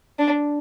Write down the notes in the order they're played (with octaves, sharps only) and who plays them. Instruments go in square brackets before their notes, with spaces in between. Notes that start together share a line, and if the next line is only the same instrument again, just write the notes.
[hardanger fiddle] D4